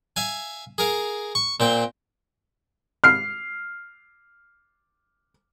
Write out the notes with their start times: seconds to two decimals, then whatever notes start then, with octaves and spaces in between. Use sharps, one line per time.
0.16 E5 F5 G#5
0.78 G#4 A#4 F5
1.35 C#6
1.60 A#2 C4 G5
3.04 F6 C7